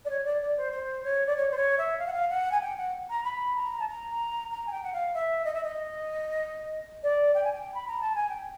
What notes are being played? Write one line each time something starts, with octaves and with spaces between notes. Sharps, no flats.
D5
C#5
D5
D5
C5
C5
C#5
D5
C#5
C5
C#5
E5
F5
F#5
F5
F#5
G#5
G5
F#5
A#5
B5
A#5
A5
A#5
A#5
G#5
G5
F#5
F5
E5
D#5
E5
D#5
D5
G5
G#5
G5
B5
A#5
A5
G#5
G5